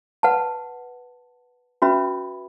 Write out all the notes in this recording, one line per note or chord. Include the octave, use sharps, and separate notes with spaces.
B4 F#5 A5
C#4 F#4 B4 E5 B5